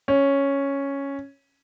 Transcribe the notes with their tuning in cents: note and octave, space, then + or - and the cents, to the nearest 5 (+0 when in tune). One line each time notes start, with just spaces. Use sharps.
C#4 +0